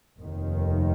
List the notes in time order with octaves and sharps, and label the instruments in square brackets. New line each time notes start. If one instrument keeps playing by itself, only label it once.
[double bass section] F1 D#2 D#3